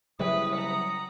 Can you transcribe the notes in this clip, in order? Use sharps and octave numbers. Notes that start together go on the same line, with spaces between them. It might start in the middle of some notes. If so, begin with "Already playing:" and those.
C#3 F#3 G3 E4 F#4 B4 D#6
F#5 A#5